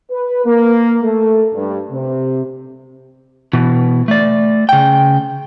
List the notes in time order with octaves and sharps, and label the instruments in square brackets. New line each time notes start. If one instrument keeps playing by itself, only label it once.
[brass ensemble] B4
A#3
A3
G2
C3
[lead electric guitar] B2 E3
A3 D5
C#3 G5